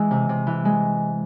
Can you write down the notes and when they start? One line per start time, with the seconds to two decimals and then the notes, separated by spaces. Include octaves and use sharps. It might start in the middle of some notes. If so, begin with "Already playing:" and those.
Already playing: E3 G#3
0.11 C3
0.29 C3
0.47 E3
0.65 G#3